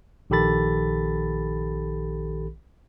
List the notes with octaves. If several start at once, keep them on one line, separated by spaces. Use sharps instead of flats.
A#1 D#3 G4 A4 B5 A6